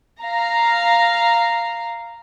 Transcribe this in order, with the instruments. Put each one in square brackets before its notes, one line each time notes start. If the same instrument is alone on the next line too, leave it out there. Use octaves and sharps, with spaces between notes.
[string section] F5 A#5